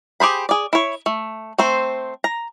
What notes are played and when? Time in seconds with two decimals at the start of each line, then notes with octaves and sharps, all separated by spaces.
0.20 G4 G#4 C5 B5
0.49 G#4 D5
0.73 E4 C#5
1.06 A3
1.58 A3 C4 C5
2.24 A#5